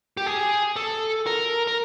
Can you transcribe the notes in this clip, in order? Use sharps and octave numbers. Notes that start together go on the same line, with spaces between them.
G4
G#4
A4
A#4
A#4